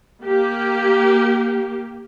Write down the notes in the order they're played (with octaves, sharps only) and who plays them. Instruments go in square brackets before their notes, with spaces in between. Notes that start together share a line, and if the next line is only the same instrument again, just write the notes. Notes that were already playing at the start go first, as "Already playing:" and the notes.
[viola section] A#3 G4